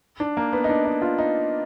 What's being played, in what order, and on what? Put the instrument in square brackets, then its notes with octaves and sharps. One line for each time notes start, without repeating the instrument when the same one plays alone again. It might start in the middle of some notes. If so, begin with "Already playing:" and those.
[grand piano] D4
A#3
B3
D#4
D4
D#4
F4
D#4